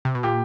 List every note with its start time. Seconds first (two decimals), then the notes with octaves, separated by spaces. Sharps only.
0.05 C3
0.15 B2
0.23 A#2 G4